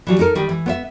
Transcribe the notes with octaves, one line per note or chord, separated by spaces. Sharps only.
E3 F#3 G3
D#4 A4 A#4
D#3 G3
E3
B3 C#5 E5